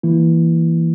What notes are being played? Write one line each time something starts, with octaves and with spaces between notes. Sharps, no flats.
E3 A#3 E4